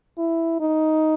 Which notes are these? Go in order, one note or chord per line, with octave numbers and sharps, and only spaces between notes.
E4
D#4